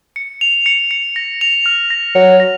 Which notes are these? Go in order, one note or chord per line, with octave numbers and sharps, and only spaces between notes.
C#7
F7
C#7
C#7
A#6
F7
F6
A#6
F#3 C#7
A#6